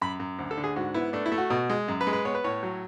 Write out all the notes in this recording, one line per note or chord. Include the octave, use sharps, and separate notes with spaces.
F#2 B5
F#2
D2
A4
D3
G#4
G#2 F#4
B3 E4
A3 D4
E4
A3
F#4
B2
G#3
F#2
B4
G#3
B4
B3 C#5
B4
A2 C#5
F#3